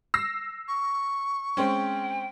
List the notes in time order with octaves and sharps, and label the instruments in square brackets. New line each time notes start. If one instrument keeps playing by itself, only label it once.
[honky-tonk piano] E6 A#6 C7
[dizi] C#6
[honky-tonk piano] G#3 C4 C#4 [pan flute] G5